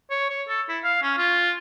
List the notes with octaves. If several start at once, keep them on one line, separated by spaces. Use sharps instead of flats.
C#5
C#5
A4
E4
F5
C#4
F4